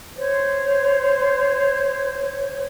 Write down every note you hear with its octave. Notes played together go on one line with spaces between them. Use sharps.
C5 C#5